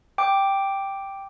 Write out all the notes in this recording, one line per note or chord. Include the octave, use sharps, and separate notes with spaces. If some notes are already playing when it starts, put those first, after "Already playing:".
G5 D6